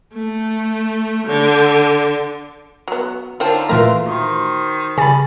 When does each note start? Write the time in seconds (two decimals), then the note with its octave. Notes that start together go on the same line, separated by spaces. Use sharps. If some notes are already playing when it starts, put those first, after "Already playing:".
0.13 A3
1.27 D3
2.88 F#3 B3
3.40 D3 D#4 F4 A#4 C5 C#5 G5 A5
3.69 A#2 E3 A3 A#4 E5 F5 C6
4.06 D#3 F#4 C5
4.98 C#3 G3 G#5 B5 A6